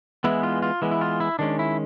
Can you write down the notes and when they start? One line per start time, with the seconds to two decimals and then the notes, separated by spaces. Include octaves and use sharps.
0.24 E3 G#3 B3 E4
0.43 F4
0.62 F4
0.82 E3 G#3 B3
0.92 E4
1.01 F4
1.20 E4
1.39 D#3 G#3 C#4 D4
1.59 E4